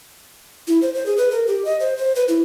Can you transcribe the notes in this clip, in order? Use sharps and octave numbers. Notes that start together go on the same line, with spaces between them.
E4
C5
C5
G#4
B4
A#4
G4
D#5
C5
C5
B4
E4